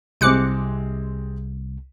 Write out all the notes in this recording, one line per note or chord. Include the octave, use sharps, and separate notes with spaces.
C2 C3 G#3 C4 D6 F#6 C#7